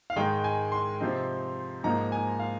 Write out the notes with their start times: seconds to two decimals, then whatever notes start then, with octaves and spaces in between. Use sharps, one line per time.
0.10 F5
0.16 G#2 D#3 G#3 D#4 G5
0.44 G#5
0.72 C6
1.00 C3 F3 C4 D#4
1.84 G#2 F3 A#3 D#4 A#5
2.12 G#5
2.40 F5